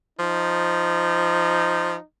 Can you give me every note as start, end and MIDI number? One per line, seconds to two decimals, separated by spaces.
0.19 1.95 53
0.19 2.05 63